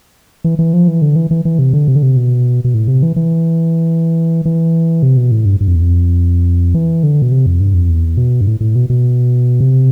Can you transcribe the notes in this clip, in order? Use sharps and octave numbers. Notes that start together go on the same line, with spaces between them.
E3
E3
F3
E3
D3
E3
E3
E3
C3
D3
C3
D3
C3
B2
B2
A2
C3
E3
E3
E3
C3
B2
A2
G2
G2
F2
E2
F2
E3
D3
B2
C3
F2
G2
F2
E2
B2
G2
A2
A2
B2
B2
C3